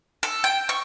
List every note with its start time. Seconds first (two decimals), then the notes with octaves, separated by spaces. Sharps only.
0.23 A4
0.44 G5
0.69 C#6